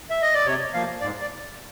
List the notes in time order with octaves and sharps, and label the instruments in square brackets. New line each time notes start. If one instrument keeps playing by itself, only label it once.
[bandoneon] E5
D#5
D5
C3 C#5
F3 A#3 F5
G#2 D5
D5